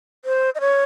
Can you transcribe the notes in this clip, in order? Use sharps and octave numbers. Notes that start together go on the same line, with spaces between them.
C5
D#5
C#5